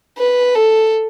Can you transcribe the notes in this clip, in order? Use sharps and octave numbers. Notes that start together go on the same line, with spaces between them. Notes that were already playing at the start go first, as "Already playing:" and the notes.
B4
A4